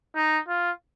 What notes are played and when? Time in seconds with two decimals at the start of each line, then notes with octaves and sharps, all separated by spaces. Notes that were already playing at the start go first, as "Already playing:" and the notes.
0.16 D#4
0.48 F4